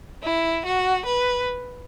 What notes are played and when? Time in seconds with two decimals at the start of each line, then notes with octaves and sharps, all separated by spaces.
0.23 E4
0.65 F#4
1.06 B4